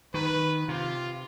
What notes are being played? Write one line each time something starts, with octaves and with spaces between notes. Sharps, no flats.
D#3 B4
C3 F4